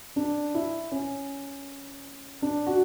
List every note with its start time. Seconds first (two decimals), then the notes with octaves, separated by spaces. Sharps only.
0.16 D4
0.55 E4
0.92 C#4
2.42 D4
2.67 F#4